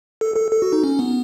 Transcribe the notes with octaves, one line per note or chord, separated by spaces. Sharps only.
A4
A4
A4
F#4
D#4
C#4
B3